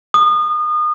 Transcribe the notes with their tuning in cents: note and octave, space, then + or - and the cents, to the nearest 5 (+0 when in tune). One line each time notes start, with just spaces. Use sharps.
D#6 -30